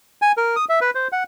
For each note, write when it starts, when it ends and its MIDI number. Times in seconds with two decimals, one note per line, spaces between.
0.22 0.32 80
0.37 0.56 70
0.56 0.65 87
0.69 0.79 76
0.81 0.91 71
0.95 1.08 72
1.12 1.24 78